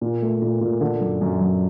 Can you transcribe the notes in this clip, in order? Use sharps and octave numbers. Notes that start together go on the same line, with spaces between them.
A#2
A3
A#2
A#2
D3
F#2
F#2
F#2